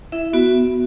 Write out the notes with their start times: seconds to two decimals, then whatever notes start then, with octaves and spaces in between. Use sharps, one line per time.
0.12 E4 E5
0.33 B3 F#4